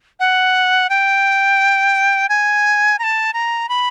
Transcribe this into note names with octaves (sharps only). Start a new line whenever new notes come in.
F#5
G5
G#5
A#5
A5
A#5
B5